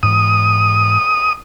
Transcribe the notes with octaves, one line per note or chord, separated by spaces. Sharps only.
G#2 E3 D#6